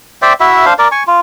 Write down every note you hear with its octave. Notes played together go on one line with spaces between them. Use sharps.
C5 D5 E5 G5
E4 F#4 E5
D4 C5 F5
A#4 D5
G#5 C#6
F4